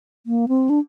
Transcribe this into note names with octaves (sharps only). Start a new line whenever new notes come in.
A#3
C4
D4